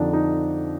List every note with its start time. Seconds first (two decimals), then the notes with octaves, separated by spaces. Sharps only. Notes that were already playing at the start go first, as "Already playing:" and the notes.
Already playing: F2 D3 F3 D4 D#4
0.13 D#4